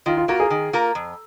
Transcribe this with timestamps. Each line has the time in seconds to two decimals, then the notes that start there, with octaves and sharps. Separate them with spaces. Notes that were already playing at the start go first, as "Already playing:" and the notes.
0.06 D#3 F4
0.17 F4
0.28 A#3 F4 F#4 A#4
0.40 G#4
0.50 D#3
0.73 A#3 F4 A#4
0.95 F2